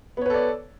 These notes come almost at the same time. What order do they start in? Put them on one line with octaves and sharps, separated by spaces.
B3 C#5 B4 A4 D5